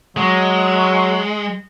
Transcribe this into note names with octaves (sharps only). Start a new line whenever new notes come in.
F#3 G#3